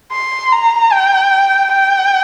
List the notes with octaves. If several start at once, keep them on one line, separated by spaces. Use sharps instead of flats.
C6
A#5
G5
G5